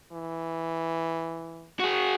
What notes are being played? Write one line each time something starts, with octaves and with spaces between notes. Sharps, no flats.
E3
F#4 G#4